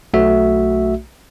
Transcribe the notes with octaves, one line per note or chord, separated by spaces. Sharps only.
B1 A3 F#4 E5